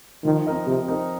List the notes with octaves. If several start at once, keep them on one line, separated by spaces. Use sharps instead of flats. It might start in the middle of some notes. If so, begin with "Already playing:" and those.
D#3 F3
C4 D#4 A#4 D#5
C3 F3
C4 D#4 A#4 D#5